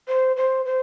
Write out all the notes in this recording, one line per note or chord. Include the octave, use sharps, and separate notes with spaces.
C5
C5
C5